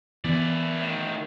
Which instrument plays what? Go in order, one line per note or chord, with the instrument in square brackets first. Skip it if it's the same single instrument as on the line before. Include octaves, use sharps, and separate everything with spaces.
[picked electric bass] E3 B3 [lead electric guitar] E4 D5
[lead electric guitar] A2 D#3